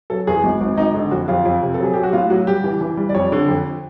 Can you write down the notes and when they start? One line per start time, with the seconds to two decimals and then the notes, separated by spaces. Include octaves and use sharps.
0.10 F#3 A4
0.27 E2 G#4
0.44 G#1
0.61 G#1
0.77 G#1 D#4
0.94 D3
1.11 F2 F#4
1.28 F2 F4
1.45 F2
1.62 C3
1.74 A4
1.80 F#3 G#4
1.93 F#3 G4
2.03 F#4
2.13 A2 F4
2.30 F#3 F#4
2.47 G3 G4
2.64 E3
2.81 E3
2.97 G3
3.09 D5
3.15 F2 C#5
3.32 D3
3.49 F2